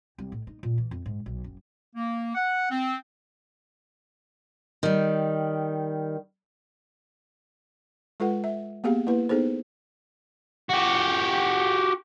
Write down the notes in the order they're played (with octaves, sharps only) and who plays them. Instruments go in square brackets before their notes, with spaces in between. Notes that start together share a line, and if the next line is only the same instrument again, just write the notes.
[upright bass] C2
A2
D#4
A#2
E3
F2
G#2
B1
F#1
[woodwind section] A#3
F#5
C4
[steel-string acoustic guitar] D#3 G3
[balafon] G#3 F4 A4 B4 F#5
E5
A#3 B3 G4 G#4 F5
A#3 E4 B4
B3 D#4 G#4 A4 C5
[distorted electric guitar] F#4 G4